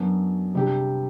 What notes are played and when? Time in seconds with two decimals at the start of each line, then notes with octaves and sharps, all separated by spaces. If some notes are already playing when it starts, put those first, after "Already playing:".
Already playing: F#2 F#3 B3 D4
0.55 C3 G3 D4 G4